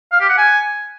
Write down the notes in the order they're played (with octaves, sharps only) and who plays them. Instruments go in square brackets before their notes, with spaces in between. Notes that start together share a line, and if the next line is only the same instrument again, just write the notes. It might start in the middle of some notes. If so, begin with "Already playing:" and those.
[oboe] F5
G4
F#5
G#5